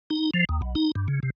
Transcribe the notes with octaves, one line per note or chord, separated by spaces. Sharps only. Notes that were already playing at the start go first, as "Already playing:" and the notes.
D#4
F3
D#2
B1
D#4
G2
C#3
C3